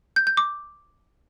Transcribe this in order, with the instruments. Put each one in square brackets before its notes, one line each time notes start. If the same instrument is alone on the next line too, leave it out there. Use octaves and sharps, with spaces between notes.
[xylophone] G6
G6
D6